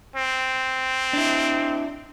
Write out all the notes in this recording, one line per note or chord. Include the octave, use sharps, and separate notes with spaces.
C4
D4 E4